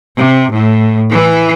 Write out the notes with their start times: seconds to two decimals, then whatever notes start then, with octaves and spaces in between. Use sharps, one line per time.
0.18 C3
0.52 A2
1.11 E3